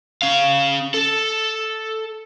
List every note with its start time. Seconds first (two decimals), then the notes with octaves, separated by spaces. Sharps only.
0.22 C#4 F5
0.94 A4